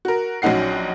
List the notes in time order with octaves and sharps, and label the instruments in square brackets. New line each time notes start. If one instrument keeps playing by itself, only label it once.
[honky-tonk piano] F#4 A#4
A#1 F#3 C#4 D#4 F#5 C7